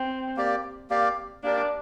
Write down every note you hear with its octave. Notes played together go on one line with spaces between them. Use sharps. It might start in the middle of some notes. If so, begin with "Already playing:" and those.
Already playing: C4
A#3 G4 D5
A#3 G4 D5 F5
A#3 D4 G4 A#4 D5